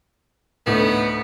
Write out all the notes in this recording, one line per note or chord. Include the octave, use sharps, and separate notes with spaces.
D2 A2 B3 D#4